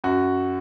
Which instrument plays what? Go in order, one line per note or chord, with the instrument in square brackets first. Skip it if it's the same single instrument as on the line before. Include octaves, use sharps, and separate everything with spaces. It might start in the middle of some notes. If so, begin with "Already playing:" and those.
[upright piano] F#2 F#4